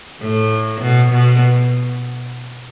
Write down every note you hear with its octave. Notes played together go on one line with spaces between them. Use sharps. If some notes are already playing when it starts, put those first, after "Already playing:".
A2
B2
B2